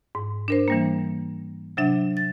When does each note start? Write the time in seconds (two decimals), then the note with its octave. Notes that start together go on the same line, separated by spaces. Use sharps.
0.15 G#2
0.48 D4 A#4 C5
0.68 E3 G3 A#3
1.77 C3 F#3 D4 E5
2.17 A6